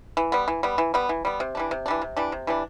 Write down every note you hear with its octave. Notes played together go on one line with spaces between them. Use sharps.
E3
G3 B3
E3
G3 B3
E3
G3 B3
E3
G3 B3
C3
E3 G3 D4
C3
E3 G3 D4
C3
E3 G3 D4
C3
E3 G3 D4